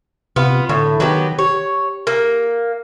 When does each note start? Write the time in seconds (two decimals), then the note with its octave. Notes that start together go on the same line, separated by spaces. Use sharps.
0.36 C3 B3 F4
0.69 A2 D3
1.00 D#3 F#3 B3 G4
1.39 G4 C#5
2.07 A#3